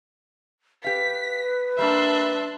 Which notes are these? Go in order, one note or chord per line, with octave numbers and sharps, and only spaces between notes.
G4 B4 F5 B6
G3 A#3 D4 E5 A5 C6 F#6